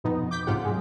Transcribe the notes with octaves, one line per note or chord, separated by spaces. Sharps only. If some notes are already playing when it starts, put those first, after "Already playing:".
F2 B2 B3 D#4
D6 G6 B6
C#2 G#2 C3 F4 G4 F#5
F#3 G#3